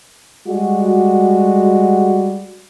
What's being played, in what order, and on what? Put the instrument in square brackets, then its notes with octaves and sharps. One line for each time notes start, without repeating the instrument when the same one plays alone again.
[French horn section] G3 G#3 F#4